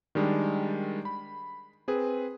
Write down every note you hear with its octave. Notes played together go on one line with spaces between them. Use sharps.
D#3 G3 G#3 D4
B5
C4 G#4 B4